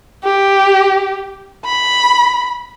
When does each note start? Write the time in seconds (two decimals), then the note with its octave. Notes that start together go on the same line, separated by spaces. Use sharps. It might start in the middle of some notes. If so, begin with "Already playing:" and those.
0.24 G4
1.65 B5